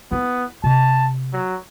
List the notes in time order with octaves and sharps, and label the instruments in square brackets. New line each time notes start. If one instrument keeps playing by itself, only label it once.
[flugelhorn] B3 [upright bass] E4
[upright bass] C3 [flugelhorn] A5
[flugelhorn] F#3